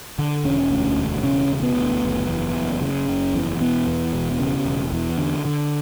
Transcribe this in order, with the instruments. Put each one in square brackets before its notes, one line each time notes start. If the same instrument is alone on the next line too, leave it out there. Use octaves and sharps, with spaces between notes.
[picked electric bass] D3
E1 C#4
D2
E1
C#3 C#4
E1
B3
D2
F#1
E2
F#1
C#3
F#1
E2
E1 B3
E2
E1
C#3
E1
E2
D3
D3